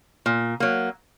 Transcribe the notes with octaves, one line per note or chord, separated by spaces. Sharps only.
A#2
F#3 A#3